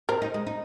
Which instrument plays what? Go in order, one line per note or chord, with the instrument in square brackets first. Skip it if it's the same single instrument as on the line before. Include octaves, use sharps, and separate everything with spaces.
[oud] C4 [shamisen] A#4
[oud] D#4
G#3
D#4